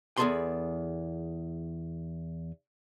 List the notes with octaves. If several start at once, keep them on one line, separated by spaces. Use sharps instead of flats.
E2 B3 G#4 A4 B5 C6